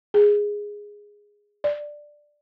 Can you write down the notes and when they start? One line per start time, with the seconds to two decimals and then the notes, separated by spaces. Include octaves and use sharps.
0.14 G#4
1.64 D5